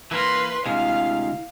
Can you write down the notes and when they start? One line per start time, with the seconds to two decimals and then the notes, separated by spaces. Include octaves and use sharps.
0.11 E3 A#3 A#4 B4 C6
0.66 D2 C3 G#3 E4 F5